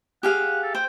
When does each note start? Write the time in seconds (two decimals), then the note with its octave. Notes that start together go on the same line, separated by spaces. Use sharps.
0.23 G4 G#4 F5 F#5
0.63 A4
0.75 C5 G5